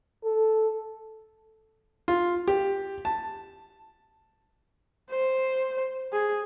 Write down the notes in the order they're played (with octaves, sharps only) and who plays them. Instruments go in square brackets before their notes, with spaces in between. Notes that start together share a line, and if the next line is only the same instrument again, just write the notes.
[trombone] A4
[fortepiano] F4
G4
A5
[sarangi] C5
G#4